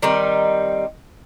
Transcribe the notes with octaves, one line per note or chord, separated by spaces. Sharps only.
D#3 G3 C4 D#4